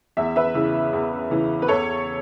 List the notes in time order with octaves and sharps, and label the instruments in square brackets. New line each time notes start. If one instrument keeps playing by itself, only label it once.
[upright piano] E2 E5
B4 E5
C#3 E3
E2
C#3 E3
B4
E2 A4 C#5